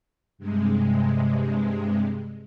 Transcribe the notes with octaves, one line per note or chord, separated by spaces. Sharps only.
G2 C3 G#3